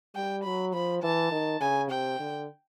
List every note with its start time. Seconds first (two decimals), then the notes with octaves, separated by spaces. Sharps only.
0.15 G3 G5
0.44 F#3 B5
0.74 F3 B5
1.03 E3 A5
1.32 D#3
1.61 C#3 G#5
1.91 C3 G5
2.20 D3